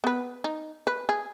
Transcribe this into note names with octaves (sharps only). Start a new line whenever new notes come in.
B3 B4
D#4
B4
G#4